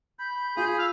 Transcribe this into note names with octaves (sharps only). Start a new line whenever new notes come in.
B5 G6
F4 G#4
F5 E6 F6